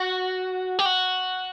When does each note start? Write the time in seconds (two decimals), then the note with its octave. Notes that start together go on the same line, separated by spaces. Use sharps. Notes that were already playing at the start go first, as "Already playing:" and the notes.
Already playing: F#4
0.79 G4
0.86 F#4